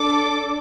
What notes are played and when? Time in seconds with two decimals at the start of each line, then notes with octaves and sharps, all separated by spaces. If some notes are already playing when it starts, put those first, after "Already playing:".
Already playing: D4 A4 D6